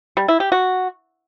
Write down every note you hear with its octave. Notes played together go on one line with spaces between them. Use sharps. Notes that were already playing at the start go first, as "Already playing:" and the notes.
G3
E4
G4
F#4